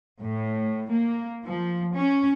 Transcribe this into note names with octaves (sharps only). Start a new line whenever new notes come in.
A2
A#3
F3
C#4